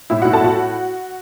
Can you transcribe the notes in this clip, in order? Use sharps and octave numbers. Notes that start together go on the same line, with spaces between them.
A2 E4 E5
A2 F#4 F#5
A4 A5
A2 F#4 F#5